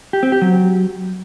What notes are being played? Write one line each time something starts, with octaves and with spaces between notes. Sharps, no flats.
G4
C4
G4
F#3